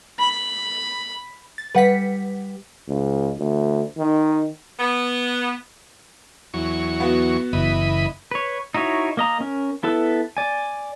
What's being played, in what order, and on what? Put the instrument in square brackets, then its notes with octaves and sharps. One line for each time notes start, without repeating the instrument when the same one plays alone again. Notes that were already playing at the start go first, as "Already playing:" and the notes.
[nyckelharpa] B5
[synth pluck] A6
[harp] G3 C#7 [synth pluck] B4 F#5 B6
[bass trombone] C#2
D2
D#3
[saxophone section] B3
[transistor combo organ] E2 F#3 C#6
[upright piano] B3 F#4
[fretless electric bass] F#1 [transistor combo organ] E3 D#5 B5
[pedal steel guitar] B4 C#5
D#4 E4 F#4 C#5
A#3 D#5 A#5
C#4 A#4
B3 E4 A4 B4
D5 G#5